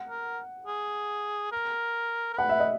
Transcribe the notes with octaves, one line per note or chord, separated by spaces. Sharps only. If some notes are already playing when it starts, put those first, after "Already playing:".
Already playing: F#5
A#4
G#4
A#4
A#4
B4 F#5
E5
D#5